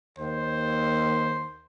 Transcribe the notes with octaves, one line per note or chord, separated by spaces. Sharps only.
D#2 C5